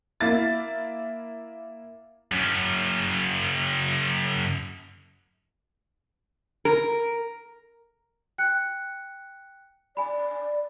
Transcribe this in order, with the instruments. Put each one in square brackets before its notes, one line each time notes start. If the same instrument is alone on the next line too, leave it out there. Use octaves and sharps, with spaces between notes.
[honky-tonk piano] A#3 E4 A6
[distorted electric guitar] F#2 C#3
[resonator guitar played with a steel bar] A#4
[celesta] G5 F#6 C#7
[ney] D5 [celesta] G#5 B5